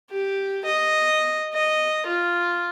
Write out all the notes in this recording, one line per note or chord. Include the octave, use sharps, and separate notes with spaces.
G4
D#5
D#5
F4